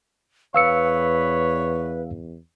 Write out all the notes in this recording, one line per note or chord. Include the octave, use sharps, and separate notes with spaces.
E2 B4 C#5 F5 E6 C#7